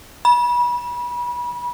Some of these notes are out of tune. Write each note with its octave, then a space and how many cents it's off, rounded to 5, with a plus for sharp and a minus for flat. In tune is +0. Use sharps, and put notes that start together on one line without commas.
B5 -30